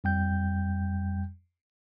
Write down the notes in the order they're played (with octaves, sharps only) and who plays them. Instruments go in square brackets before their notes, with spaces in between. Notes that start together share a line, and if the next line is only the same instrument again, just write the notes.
[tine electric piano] F2 G3 G5 G6